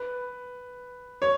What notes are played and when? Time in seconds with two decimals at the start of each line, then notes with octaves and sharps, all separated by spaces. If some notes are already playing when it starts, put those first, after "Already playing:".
Already playing: B4
1.22 C#5